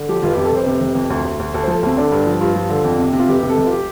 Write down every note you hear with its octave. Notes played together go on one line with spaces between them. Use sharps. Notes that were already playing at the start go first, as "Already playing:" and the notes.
Already playing: D3
F3 G4
F1 F4
G4
F2
A4
F1 C5
C3
F1
F2
D2
D2
D2
D2 A4
C5
F3 A4
D2 C4
D3 D4
G2
F3
G2 F4
F3
D3
F2
C3
C3
F4
F1 G4
C3
A4
F1
F4
G4